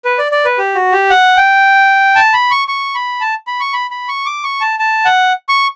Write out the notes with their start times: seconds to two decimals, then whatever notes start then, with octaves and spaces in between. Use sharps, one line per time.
0.05 B4
0.18 D5
0.32 D5
0.45 B4
0.58 G4
0.75 F#4
0.92 G4
1.10 F#5
1.37 G5
2.15 A5
2.33 B5
2.51 C#6
2.68 C#6
2.95 B5
3.21 A5
3.47 B5
3.60 C#6
3.73 B5
3.91 B5
4.09 C#6
4.26 D6
4.44 C#6
4.61 A5
4.79 A5
5.05 F#5
5.49 C#6